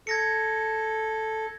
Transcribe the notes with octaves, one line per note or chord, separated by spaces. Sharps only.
A4 G#6 A#6 C#7